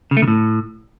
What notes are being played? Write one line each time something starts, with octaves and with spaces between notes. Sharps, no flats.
C#3
A3
C#3
A2